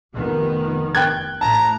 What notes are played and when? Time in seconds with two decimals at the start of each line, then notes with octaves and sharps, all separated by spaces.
0.16 F1 D#3 B3
0.95 G5 F#6 G#6
1.41 A2 A5 A#5